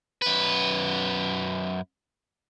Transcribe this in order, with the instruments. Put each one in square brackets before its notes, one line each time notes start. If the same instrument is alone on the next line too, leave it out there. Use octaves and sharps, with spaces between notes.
[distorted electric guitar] F#2 B4